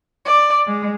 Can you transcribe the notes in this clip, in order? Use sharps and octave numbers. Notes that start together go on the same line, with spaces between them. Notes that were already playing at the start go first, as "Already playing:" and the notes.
D5
G#3